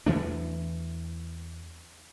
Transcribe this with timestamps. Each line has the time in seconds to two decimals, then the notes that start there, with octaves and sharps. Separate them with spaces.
0.06 E2 E3 A3 D4